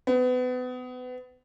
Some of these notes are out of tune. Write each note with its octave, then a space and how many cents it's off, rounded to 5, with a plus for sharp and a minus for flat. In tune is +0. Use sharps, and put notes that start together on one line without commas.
B3 +30